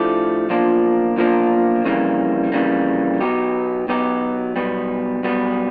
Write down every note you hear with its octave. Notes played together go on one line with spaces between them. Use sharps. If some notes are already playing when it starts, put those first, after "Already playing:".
Already playing: A2 F3 A3 D4 G4
B1 A#2 F3 A#3 D4
B1 A#2 F3 A#3 D4
F2 C#3 E3 G3 A#3
F2 C#3 E3 G3 A#3
B2 F#3 B3 D#4 G4
B2 F#3 B3 D#4 G4
B1 B2 G3 B3
B1 B2 G3 B3